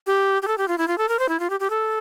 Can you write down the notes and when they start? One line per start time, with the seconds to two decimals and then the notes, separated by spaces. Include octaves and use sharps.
0.07 G4
0.42 G4
0.48 A4
0.58 G4
0.68 F4
0.78 E4
0.88 F4
0.98 A4
1.09 A#4
1.19 C5
1.29 E4
1.40 F4
1.50 G4
1.60 G4
1.70 A4